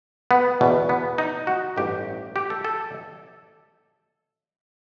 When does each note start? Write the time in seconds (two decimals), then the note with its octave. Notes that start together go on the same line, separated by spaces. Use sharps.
0.31 B3
0.61 E2 B2
0.89 B3
1.18 D#4
1.47 F#4
1.76 A1 G2 D#3 G4
2.36 G4
2.50 A4
2.64 A4